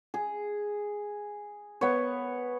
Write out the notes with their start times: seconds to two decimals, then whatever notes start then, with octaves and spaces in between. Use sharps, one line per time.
0.14 G#4
1.81 B3 C#5